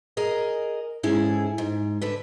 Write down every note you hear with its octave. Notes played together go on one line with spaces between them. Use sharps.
G#4 A#4 D#5
G#2 C#4 E4 G#4 A4
G#2
D3 A4 B4